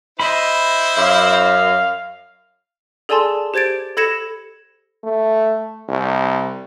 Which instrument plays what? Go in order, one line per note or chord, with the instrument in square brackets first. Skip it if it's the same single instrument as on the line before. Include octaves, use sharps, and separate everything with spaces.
[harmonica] E4 C5 [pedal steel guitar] D#5 B5
[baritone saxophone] F#2 [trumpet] F5
[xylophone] G#4 A4 D5 G#5 A5 C6
G4 C5 G#6 A6 D7
A4 B5 G#6 A#6 C#7 E7
[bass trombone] A3
C2